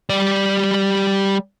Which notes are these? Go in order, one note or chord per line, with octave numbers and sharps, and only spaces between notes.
G3 D5